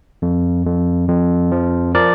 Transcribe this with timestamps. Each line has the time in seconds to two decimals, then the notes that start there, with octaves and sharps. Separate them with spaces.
0.22 F2
0.66 F2
1.08 F2
1.52 F3
1.95 F3 A#4 D5